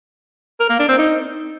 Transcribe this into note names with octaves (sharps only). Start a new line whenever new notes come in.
A#4
A#3
D4
C4
D#4